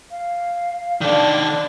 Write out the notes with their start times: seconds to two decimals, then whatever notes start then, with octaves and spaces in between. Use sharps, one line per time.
0.11 F5
1.01 D#3 D4 A4 D5 A5